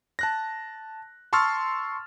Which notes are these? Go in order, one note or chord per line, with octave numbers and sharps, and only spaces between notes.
A5 F#6 A#6
A5 C6 C#6 E6 F6 A6